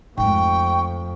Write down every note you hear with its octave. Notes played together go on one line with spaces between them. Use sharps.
F2 G#2 A3 G5 C#6